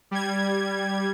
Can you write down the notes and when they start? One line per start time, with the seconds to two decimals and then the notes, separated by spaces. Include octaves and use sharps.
0.11 G3 G#6